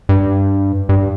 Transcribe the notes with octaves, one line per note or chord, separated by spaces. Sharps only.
G2
G2